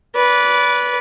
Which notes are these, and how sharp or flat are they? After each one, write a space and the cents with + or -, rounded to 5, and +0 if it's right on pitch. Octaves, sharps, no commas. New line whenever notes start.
B4 -10 D5 -25